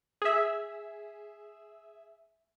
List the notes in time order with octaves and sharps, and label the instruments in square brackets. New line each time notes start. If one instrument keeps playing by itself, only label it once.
[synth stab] G#4 E5